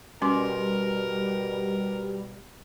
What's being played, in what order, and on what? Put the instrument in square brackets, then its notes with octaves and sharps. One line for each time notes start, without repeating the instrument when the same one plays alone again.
[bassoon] B2 [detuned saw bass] G3 [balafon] C#4 C6 D6 [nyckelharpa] A#4